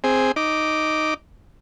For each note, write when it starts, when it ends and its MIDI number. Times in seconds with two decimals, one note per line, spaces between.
0.04 0.32 60
0.04 0.32 68
0.36 1.14 63
0.36 1.14 86